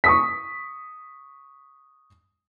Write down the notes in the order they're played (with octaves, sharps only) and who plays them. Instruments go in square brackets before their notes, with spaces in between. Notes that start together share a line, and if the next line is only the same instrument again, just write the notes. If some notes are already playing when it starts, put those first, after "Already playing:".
[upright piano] C#6 D#6 B6